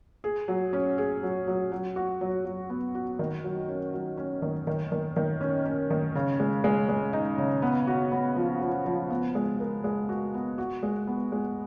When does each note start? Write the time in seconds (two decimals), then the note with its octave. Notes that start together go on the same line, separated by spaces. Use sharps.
0.24 G#4
0.48 F#3
0.73 C#4
0.98 G#4
1.23 F#3
1.47 F#3
1.72 F#3
1.96 F#4
2.21 F#3
2.45 F#3
2.70 B3
2.95 F#4
3.19 D#3
3.44 F#3
3.69 C#4
3.93 F#3
4.17 C#4
4.42 D#3
4.67 D#3
4.92 D#3
5.16 D#3
5.41 C#4
5.66 C#4
5.90 D#3
6.15 C#3
6.40 G#3
6.64 G#3
6.89 G#3
7.13 D#4
7.38 C#3
7.62 B3
7.87 F#4
8.12 B3
8.36 F3
8.61 F3
8.86 F3
9.10 B3
9.35 G#3
9.60 A#4
9.84 G#3
10.09 F#4
10.34 B3
10.58 F#4
10.83 G#3
11.07 B3
11.32 G#3